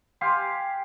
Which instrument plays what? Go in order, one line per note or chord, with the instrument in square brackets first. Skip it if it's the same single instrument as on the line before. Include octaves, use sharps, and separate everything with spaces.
[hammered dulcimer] G4 F5 G#5 C6